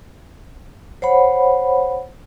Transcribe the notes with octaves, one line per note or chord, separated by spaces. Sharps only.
C5 C#5 F#5 B5